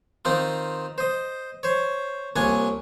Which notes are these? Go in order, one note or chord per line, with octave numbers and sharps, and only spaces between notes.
D#3 C4 D#4 F4
C5 D#5
C5 C#5
C2 A#2 D4 C#5 G#5